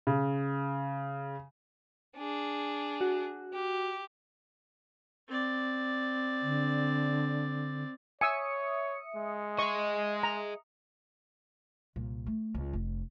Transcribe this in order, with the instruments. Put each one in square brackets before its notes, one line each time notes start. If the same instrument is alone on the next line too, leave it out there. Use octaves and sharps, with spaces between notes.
[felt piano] C#3
[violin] D4 G#4
[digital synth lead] F#4
[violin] G4
[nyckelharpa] C4 D5
[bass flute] D3
[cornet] C#5 [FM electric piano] E5 D#6 C#7 [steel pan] G#5 E6
[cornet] G#3
[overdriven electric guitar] G#4 D#5 [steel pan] C#6
[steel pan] A#5
[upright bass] C2 A#2
A3
C#2
F1